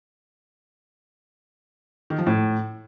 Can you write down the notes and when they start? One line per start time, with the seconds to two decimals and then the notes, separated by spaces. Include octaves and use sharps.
2.10 D#3
2.18 F3
2.27 A2